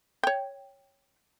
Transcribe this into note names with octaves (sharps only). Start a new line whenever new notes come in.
C#5 G5